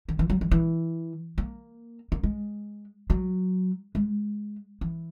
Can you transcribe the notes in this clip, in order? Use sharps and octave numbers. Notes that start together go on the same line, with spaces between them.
D#3
E3
F#3
E3
E3
A#3
A#3
G#3
F#3
G#3
E3